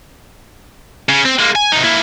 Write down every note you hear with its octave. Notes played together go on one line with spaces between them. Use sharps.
C#3
C4
G#3 A#3
G#5
C3 D#4
A#3 E4